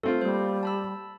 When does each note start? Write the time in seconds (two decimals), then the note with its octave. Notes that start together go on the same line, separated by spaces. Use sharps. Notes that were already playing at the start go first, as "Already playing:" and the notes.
0.03 A3 C4 F4 A4
0.22 G3 A#3 C5
0.63 A5 B5 E6